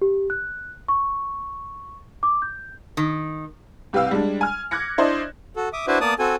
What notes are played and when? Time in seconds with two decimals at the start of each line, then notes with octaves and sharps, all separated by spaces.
0.02 G4
0.30 F#6
0.88 C#6
2.23 D6
2.42 G6
2.97 D#3
3.93 C2 G4 B4 F5 E6
4.11 G3 G#3 D4
4.41 G#5 F6
4.71 D6 F#6 G#6 A#6 C#7
4.98 D4 E4 C5 D5 D#5
5.56 F#4 A4
5.73 E5 D6 D#6
5.87 D4 E4 F#4 B4 C5 E5
6.00 A#3 B3 D5 A5 D#6
6.19 C4 F#4 A4 G#5